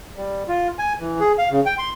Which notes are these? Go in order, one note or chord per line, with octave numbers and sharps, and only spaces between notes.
G3
F4
G#5
E3
G#4
F5
C#3
G5
C6